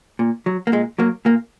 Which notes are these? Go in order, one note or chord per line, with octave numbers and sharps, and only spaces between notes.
A#2
F#3
A#3
A#2 G#3
F#3 A#3
A#2 A#3